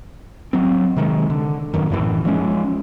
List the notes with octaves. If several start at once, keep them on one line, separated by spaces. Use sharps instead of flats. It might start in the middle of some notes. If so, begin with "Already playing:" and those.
F#3 C4
C3 D#3 G#3
D3
D1 F#2 D#3
F#2 A2 E3
F3 G#3 C#4